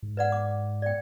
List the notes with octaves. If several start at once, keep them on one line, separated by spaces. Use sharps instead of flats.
G#2
B4 D5 F#5
D6
D5 G5